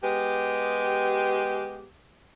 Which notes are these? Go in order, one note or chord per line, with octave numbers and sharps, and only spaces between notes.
G#3 B3 G4